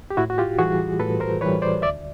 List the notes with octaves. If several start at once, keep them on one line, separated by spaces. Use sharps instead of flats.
G4
A2 E4 F#4
F#4
F4 G4
E3 G3 F#4 G#4
A2 A4 B4
A#4 C5
E3 G3 B4 C#5
C5 D5
D2 D5 E5